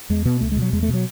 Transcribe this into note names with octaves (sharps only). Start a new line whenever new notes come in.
E2 G#3
B2 B3
C#2 A3
G#3
B2
F#3
E2 G#3
A3
B2 F#3